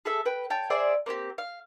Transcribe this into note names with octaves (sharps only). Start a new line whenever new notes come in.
G#4 A4 E5 E6
B4 G5
C#5 G5 A5
G#4 C5 D5 E5
A#3 C4 E4 G4
F5